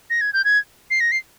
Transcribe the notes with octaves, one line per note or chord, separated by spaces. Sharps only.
A#6
G#6
G6
G#6
C7
A#6
C7